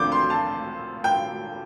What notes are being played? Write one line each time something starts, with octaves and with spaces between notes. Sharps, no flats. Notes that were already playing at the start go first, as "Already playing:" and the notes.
Already playing: D2 D3 F3 C4 D6 G6
C6
A5
G5